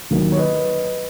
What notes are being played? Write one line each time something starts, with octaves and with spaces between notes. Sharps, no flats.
D#2 D#3 F#3 A#3
C#5
B4 D#5